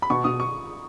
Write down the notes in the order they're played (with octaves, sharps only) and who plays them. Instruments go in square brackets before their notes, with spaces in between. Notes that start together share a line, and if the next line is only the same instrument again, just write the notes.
[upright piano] B5
[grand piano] B2 [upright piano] C#6
[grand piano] B2 [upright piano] D#6
[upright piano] C#6